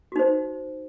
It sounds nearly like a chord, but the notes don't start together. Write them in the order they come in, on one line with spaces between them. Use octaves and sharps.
F#4 D#4 C5